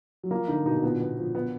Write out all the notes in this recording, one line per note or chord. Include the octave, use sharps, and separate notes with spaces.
F#3
F3 A#3
D3 D#4
B2 D#4
B2
A#2 B3
B3
F3
B3